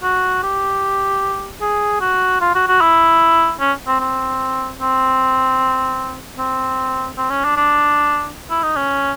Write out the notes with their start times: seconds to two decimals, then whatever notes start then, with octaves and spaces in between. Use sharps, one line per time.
0.03 F#4
0.43 G4
1.61 G#4
2.01 F#4
2.41 F4
2.55 F#4
2.68 F#4
2.81 E4
3.60 C#4
3.87 C4
4.00 C4
4.80 C4
6.38 C4
7.18 C4
7.31 C#4
7.44 D4
7.56 D4
8.50 E4
8.63 D#4
8.76 C#4